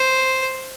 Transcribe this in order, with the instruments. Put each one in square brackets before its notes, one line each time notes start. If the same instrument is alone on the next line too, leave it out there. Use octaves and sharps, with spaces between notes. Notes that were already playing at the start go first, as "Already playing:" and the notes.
Already playing: [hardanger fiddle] C5